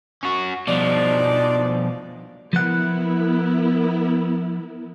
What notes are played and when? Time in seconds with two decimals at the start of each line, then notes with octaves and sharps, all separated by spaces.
0.23 C#4 F#4
0.67 B2 F3 D4 D#4 D5
2.53 F3 B3 E4 A#4 F#5